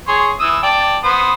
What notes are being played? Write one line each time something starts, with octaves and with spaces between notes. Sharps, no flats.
G#4 C#5 C6
E3 D#6 E6
D5 G5 A5
B3 C5 D#6